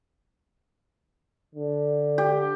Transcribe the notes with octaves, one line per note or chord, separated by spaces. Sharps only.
D3
G4